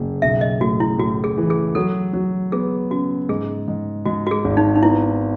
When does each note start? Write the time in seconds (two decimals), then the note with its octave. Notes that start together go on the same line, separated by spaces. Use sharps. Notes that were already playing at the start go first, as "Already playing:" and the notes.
Already playing: F#1
0.22 B1 E5
0.41 D#5
0.60 A2 F#4
0.80 E4
0.98 A2 F#4
1.24 G#4
1.37 E3
1.50 G#4
1.75 F#3 A4
2.13 F#3
2.52 B3 G#4
2.90 C#3 F#4
3.29 G#2 G#4
3.68 G#2
4.05 G#2 F#4
4.27 F#4
4.31 G#4
4.45 G#1
4.57 D#4
4.75 D#4
4.83 B3 E4